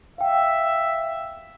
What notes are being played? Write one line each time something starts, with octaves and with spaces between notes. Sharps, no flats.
E5 F5 G5